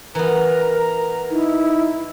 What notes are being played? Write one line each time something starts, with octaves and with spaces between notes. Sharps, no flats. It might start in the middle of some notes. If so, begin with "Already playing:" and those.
E3 B3 A#4 A#5
D#4 E4